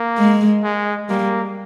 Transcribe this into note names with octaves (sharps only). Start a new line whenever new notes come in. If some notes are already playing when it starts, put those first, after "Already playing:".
Already playing: A#3
G#3
G#3
G3 A#3